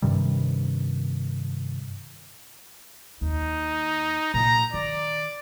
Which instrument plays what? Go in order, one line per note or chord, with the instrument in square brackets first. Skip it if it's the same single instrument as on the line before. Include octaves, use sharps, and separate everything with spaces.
[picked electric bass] G2 C3 D#3 G3
[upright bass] D#2 [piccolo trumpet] D#4
[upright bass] A#2 [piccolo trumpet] A#5
[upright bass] D#3 [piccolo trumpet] D5